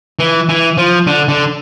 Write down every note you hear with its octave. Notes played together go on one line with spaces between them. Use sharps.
E3
E3
F3
D3
D3